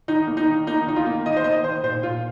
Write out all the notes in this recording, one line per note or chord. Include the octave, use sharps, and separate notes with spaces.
D#3 D#4
A#3
D#4
D#3
A#3 D#4
D#3 D#4
F4
A#3
D#3 D#5
C5
A#3 D#5
D#3 C5
A#2 C5
A#2 F4